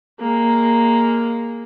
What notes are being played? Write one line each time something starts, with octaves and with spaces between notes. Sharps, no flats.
G#3 A#3